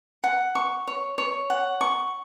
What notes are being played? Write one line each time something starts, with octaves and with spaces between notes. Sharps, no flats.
F#5
C#6
C#5
C#5
F#5
C#6